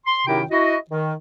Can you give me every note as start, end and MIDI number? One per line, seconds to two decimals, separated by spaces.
0.06 0.26 84
0.27 0.43 42
0.27 0.43 48
0.27 0.43 51
0.27 0.43 63
0.27 0.43 64
0.27 0.43 79
0.51 0.76 64
0.51 0.76 66
0.51 0.76 75
0.90 1.14 51